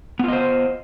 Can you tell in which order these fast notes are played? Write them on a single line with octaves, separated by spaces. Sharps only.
B3 F4 D#5 C5